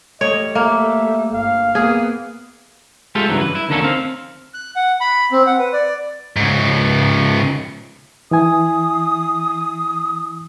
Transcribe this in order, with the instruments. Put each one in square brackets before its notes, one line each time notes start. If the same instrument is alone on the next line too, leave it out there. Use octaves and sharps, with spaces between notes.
[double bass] G3 A3 [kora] C#5 [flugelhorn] D#5
[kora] A#3 [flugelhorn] E5
[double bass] G1 [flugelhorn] F5
[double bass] A#3 B3 [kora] G#4
[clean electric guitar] G#3 A3 F4 G4 A4
G2 C#3 E3 F#3
B4
E4
D2 D3 D#3 A#3 C#4 A4
C4 F5
[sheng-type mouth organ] F#6
F#5
B5
C4
F#5
B4
D5
[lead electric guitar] G#2 C#3
[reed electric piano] E3 E4 G#5 [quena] D#6